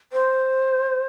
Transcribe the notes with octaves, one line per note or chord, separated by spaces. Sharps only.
C5